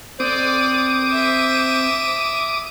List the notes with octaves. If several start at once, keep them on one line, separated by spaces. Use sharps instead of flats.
C4 C5 D5 D6 D#6
E5